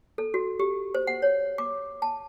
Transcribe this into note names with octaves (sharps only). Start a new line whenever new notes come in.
A4
F#4
G4
C5
F#5
C#5
D6
A5